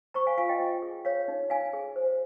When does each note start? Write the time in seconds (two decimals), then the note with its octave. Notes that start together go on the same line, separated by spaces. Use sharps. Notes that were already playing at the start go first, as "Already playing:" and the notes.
0.14 C5 A#5 C#6
0.27 F5 G#5
0.38 F4 F5 G#5
0.49 D#5 G5
0.60 F4
0.82 G#4
1.05 C#5 F5
1.28 D#4
1.50 D#4 F5 G#5
1.73 G#4
1.96 C5